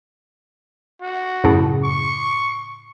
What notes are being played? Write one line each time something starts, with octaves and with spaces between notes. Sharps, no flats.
F#4
F#2 A2 C#3
C#6